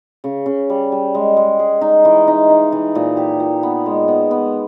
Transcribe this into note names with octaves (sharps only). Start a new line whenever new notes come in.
C#3
C#3
G3
G3
G#3
G#3
G#4
D#4
E3
D#4
D#4
E3
A#2
G4
A#2
B3
G#3
B3
B3